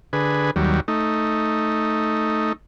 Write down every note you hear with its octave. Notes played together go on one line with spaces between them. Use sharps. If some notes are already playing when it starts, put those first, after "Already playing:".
D3 G#4 B4
D#2 F#3 G3
A3 D#4